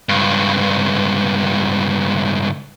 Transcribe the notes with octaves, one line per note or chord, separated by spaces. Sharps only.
C#2 G2